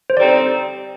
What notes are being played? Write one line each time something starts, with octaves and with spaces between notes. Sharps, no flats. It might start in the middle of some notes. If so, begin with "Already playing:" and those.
C5
D3 G3 C4 D#4 D5